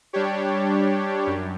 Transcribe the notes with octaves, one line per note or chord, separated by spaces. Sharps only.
G3 D4 G4 C#5
F#2